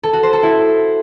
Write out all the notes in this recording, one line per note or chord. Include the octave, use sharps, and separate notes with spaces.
A4
F#4
C5
A4
E4